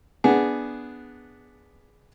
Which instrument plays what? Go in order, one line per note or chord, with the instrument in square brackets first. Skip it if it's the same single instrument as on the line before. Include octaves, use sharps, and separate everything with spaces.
[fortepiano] B3 D4 G#4